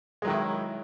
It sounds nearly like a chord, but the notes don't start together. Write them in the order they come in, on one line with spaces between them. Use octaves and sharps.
G#3 F#3 D#3 E4